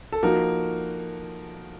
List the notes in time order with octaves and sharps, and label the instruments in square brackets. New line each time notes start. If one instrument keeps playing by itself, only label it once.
[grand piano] A4
[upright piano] F3 A#3 D#4 F#4 [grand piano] A#4